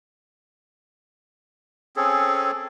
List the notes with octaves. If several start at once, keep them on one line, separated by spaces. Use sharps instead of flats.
C4 C#4 G#4 A4